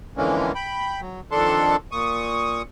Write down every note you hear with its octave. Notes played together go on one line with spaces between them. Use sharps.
F2 D3 E3 G#3 A#3 C#4
G5 B5
F#3
F2 D#3 D4 A4 A5 C6
A#2 C#6 D#6